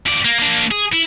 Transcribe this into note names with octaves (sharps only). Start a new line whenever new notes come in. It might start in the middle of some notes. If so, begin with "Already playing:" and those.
F2 D5
A#3
A#3 D4
G#4
E4